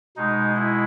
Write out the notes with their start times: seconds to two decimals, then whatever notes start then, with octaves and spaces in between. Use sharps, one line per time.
0.16 B2 G#3 D#4
0.56 E4